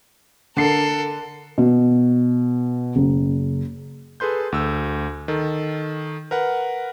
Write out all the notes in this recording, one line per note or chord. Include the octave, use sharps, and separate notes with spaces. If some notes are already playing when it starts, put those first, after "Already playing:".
D3 A4 A#4 C7
B2
F#1
G#4 A4 B4 C6 G6
D2 E6
D#3 A4
A#4 B4 F#5